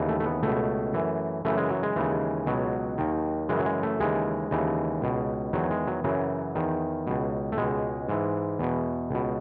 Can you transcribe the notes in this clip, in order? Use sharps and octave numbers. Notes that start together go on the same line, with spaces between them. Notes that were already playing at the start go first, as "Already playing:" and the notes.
Already playing: D#2 C#3 E3
A3
A3
B3
C#2 B2 A3
F#2 E3
F#2 C#3 E3 A3
G#3
F#3
G#3
D#2 C#3 E3
C#2 B2 F#3
D#2 D#3
F#2 C#3 E3 G#3
F#3
G#3
A3
D#2 C#3 E3 G#3
D#2 C#3 E3
C#2 B2
E2 D#3 F#3
G#3
F#3
F#2 C#3 E3 F#3
E2 D#3
C#2 B2
A3
C#2 B2 G#3
G#2 E3
E2 B2
C#2 B2